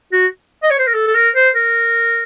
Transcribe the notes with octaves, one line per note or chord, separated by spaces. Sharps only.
F#4
D#5
C#5
C5
A#4
A4
A4
A#4
C5
A#4